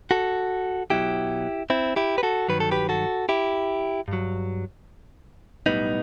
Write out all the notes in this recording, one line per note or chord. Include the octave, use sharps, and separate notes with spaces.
F#4 A4
B1 B2 F#3 E4 G4
C4 E4
E4 G4
B4
F#4 A4
G2 D#3 F#3 B4
A4
G4 B4
F#4 A4
E4 G4
G2 F#3
B1 A2 G3 B3 D#4